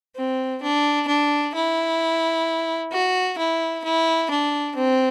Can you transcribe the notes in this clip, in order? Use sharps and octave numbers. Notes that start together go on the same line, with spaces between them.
C4
D4
D4
E4
F#4
E4
E4
D4
C4